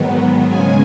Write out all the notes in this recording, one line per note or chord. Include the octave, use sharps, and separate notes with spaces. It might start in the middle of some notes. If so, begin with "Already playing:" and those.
Already playing: G#2 D#3 F#3 B3
C#3 G#3 C#4 G#5